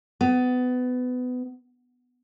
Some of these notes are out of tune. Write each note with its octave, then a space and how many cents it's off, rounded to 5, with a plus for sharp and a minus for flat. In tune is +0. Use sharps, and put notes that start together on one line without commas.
B3 +25